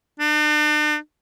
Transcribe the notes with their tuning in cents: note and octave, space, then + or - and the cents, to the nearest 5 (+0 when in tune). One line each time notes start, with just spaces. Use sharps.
D4 +45